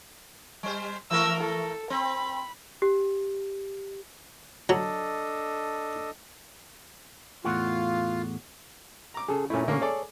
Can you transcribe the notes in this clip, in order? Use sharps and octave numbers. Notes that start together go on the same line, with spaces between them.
G3 C5
E3 A3 A#4 E6
A4
C4 B5
G4
F#3 D4 A4 D#5
E2 A2 F4 F#4
A#5 D6
C#3 G#4 A4
A#2 A3 C#4 E4
D3 A#3 C#4 C#6
G#4 A4 C#5 D5